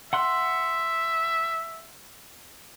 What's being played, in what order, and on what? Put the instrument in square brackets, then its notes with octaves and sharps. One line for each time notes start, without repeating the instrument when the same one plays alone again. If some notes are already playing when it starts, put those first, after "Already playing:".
[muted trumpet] E5 [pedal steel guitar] F#5 C6 F#6